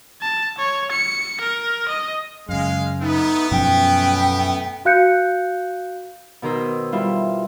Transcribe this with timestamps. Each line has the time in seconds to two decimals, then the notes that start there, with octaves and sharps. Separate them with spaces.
0.21 A5
0.58 C#5
0.91 C#7
1.40 A#4
1.88 D#5
2.49 F#2 C#3 G#3 F5
3.01 A3 B3 D#4
3.51 F#2 B2 F3 C#4 G5
4.85 F#4 F5 F#6 G6 C#7
6.42 B2 D#3 A#4 C5 E6
6.92 G3 E4 F4